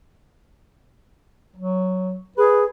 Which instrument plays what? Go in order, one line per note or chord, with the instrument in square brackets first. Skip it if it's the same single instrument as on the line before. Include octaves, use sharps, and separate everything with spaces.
[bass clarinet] F#3
[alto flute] G#4 [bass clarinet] B4